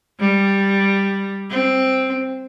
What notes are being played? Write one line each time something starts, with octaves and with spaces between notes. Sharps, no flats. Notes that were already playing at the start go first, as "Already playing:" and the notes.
G3
C4